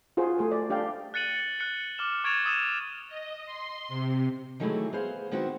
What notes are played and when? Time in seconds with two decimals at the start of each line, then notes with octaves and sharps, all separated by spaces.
0.17 F4 F#4 G#4 C5
0.38 A3 G#4 C5
0.52 D5
0.70 D4 G4 D5 F5 G5
1.14 F#6 A6 C#7 D#7 F#7
1.60 F#6 C#7
1.98 D6 F6 E7
2.24 C#6 G#6 A6 D7 E7 F7
2.46 D#6 E6 D#7 E7
3.08 D#5
3.46 C6
3.88 C3
4.60 D#3 E3 F#3 G#3 A3 E4
4.93 B3 G#4 C5 F5
5.31 D#3 B3 C4 E4 F#4